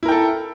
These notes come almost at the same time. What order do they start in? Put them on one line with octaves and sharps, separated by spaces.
E4 A#4 G5 A4